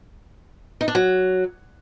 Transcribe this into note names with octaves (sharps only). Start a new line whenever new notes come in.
D#4
D4
F#3